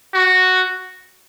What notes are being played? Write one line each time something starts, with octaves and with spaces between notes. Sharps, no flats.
F#4